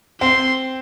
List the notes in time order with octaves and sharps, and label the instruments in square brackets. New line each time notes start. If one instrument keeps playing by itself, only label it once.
[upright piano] C4 [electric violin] C6